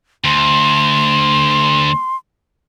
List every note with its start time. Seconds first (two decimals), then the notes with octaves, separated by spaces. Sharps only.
0.24 D2 C6